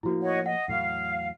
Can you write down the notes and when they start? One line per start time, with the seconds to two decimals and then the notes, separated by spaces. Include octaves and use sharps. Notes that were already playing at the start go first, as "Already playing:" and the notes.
0.03 A2 F3 A#3 E4 F#4
0.22 C#5 D#5 F#5
0.46 D#5 F#5
0.68 E2 A2 F#3 F5